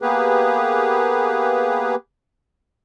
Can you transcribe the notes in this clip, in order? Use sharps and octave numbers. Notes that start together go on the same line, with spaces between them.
A#3 B3 G4 G#4 B4